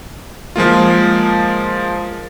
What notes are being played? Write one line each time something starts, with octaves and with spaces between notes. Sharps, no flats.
F3 G#3 A#3 F4